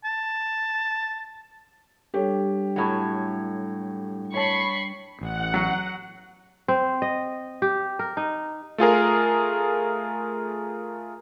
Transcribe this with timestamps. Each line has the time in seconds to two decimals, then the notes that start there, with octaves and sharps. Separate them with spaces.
0.05 A5
2.14 G3 D4 G4 A4 C#5 G5
2.76 A2 F#3
4.34 C#5 A5 B5 C#6 C7
5.21 A1 F#5
5.54 F#3
6.68 C4
7.02 D#5
7.62 G4
7.99 A#4
8.17 D#4
8.78 A3 F4 G#4 A#4